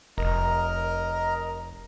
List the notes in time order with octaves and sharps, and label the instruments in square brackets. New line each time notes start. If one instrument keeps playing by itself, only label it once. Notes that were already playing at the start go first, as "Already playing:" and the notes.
[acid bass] F1 [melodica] A#4 D#5 A#5